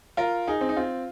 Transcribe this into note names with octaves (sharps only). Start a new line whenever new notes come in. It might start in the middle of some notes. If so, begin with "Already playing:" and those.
F4 A#4
D#4 G#4
C4
D#4
C4 F4